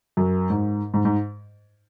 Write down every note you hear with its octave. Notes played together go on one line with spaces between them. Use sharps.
F#2
G#2
G#2
G#2